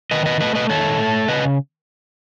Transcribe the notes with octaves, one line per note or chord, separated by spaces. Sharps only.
D#3 B4 D#5
B4 D#5
A3 B4 D#5
B4 D#5
D#3 A4 C#5
A3
C#3 B4 D#5